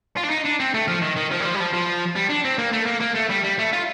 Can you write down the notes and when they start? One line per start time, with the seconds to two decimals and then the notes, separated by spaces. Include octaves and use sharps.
0.18 F4
0.24 D4
0.31 D#4
0.45 D4
0.60 C4
0.74 A3
0.88 F3
1.02 D#3
1.16 D#3
1.31 F3
1.40 G3
1.45 F3
1.54 G3
1.60 F3
1.73 F3
2.16 G3
2.30 D4
2.45 C4
2.58 A#3
2.73 A3
2.87 A#3
3.02 A#3
3.16 A3
3.30 G3
3.44 G3
3.59 A3
3.73 F4